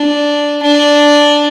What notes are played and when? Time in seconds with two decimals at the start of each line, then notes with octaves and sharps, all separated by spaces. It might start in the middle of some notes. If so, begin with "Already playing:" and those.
Already playing: D4
0.62 D4